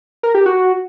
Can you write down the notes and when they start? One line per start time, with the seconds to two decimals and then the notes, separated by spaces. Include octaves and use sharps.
0.23 A#4
0.35 G4
0.46 F#4